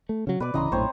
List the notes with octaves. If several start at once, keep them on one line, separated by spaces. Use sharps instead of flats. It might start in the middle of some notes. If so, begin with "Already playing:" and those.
A3
C#3 F#3
B2 B4 D5 D6
D1 C#3 E3 D#5 A#5 C6
A#1 F#2 A2 C4 C5 C#5